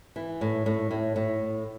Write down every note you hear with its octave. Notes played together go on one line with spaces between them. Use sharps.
E3
A2
A2
A2
A2